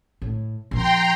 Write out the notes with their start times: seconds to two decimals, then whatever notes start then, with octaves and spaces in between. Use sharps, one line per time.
0.22 A2
0.71 A#2 F3 G5 A#5 C6